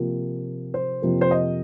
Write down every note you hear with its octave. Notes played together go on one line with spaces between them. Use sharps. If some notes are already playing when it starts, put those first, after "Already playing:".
Already playing: C3 F3 A#3
C5
F2 C3 F3 A#3
C5
D#5